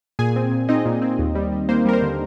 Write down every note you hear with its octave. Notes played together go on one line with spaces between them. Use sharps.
A#2 G#4 G#5
C4
A#2
C4 D#4 D#5
A#2
C4
D#2
G3
G3
A#3 C5
G3 A#4
C5
D3